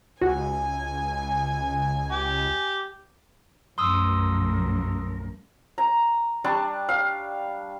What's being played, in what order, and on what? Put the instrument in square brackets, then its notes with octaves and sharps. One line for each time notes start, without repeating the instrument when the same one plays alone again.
[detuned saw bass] C#2 [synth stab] F#4 [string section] G#5
[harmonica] G4
[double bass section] B1 A3 [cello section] F#2 F3 A#4 [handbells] C6 D#6 E6
[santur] A#5
G3 D4 A5 C#6
F5